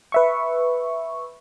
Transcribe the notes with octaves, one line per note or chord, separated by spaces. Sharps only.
B4 E5 C#6